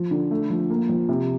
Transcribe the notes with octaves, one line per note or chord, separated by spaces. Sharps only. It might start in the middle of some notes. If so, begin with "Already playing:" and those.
Already playing: F3
D3
A3
F3
A#3
F3
C3